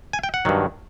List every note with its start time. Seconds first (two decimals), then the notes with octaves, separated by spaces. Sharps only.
0.13 G#5
0.24 G5
0.34 F#5
0.45 G2 D#3 F#3